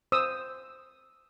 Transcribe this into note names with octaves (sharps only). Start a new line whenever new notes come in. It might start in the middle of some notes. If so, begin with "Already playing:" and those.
C5 D#6 E6